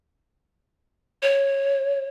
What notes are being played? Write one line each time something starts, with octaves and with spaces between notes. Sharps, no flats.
C#5